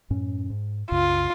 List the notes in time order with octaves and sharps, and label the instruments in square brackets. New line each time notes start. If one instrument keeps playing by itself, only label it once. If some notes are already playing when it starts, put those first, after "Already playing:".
[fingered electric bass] F#2 A2 C#4
G#2
[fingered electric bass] C2 F#2 C#3 [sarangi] F4